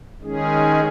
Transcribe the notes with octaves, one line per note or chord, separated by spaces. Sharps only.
D#3 G#3 C#4 G#4